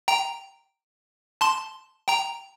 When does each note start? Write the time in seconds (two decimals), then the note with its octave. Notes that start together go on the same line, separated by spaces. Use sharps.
0.08 G5 A#5
1.41 A5 C6
2.08 G5 A#5